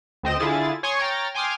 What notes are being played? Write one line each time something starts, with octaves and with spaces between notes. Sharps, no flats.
D2 C4 D#5 E7
D3 E4 F4 G#4 A6
C#5 G#5 C6 C#6 D#6
C#5 G5 A#5 F6 A6
G5 G#5 C6 D6 D#6 F6